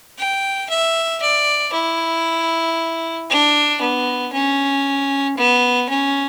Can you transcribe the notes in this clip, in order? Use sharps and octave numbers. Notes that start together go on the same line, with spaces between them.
G5
E5
D5
E4
D4
B3
C#4
B3
C#4